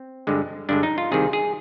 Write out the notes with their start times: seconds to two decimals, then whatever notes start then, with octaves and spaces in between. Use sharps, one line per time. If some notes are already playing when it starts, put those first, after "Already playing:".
Already playing: C4
0.27 G2 D3 G#3
0.69 G2 D3 G#3 D4
0.83 D#4
0.98 F4
1.12 C2 C3 D#3 G#4
1.33 G#4